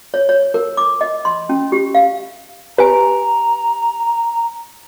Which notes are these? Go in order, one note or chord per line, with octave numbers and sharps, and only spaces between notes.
C#5
C#5
A#4
D6
D#5
C6
C#4
G4
F5
G4 B4 G#5 A#5